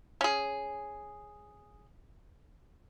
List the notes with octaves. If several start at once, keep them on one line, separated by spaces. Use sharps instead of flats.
C#4 G#4